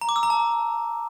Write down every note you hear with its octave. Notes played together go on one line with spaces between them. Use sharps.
A#5
D6
E6
A#5
A5